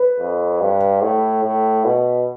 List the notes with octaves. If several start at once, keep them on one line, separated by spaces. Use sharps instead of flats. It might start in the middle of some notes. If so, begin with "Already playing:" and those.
Already playing: B4
F2
G2
A2
A2
B2